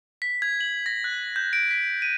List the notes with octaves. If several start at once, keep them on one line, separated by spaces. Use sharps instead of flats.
B6
G#6
F#7
A#6
F#6
G6
D7
B6
D#7